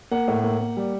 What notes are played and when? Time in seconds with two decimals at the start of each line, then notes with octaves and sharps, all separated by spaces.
0.11 A#3 F#5
0.28 A2
0.44 A#3
0.61 A#3
0.77 G3